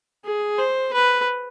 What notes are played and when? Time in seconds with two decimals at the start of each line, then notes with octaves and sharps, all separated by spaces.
0.25 G#4
0.58 C5
0.93 B4